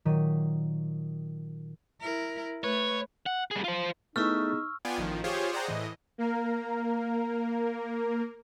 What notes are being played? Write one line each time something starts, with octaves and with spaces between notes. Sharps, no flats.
A#2 D#3 F#3 B6 D#7
E4 A#4
A3 B4 C#5
F#5
G3 G#4
F4 C5
A3 B3 D#4 E4 G#4 C#6 E6 F6
B3 F4 D5 G5 G#5
A1 D#3 F3
F4 G4 G#4 C5 C#5
G#4 C5 D5 F#5 G5 A#5
A2 E3 D#5
A#3 A#4